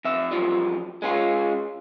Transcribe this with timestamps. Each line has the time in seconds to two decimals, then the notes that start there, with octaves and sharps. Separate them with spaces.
0.05 F2 E5
0.31 F#2 F3 G3
1.02 G#3 C#4 F4